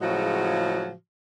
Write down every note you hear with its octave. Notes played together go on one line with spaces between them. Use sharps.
A2 C#3 F3 F#3 G#3 F#4